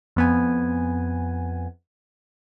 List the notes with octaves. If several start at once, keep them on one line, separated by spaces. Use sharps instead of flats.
F2 B3 G#5